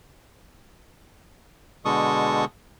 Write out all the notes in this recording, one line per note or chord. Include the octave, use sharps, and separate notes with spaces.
B2 D3 G#3 A4 C#6 D#6